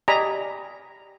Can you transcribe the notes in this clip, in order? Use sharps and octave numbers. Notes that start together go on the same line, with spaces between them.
G4 D5 D#5 G#5 A#5 B5